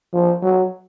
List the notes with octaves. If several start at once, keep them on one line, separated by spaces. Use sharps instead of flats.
F3
F#3